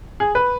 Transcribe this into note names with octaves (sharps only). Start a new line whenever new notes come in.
G#4
B4